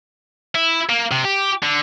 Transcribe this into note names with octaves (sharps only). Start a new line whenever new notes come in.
E4
A#3
C3
G4
D3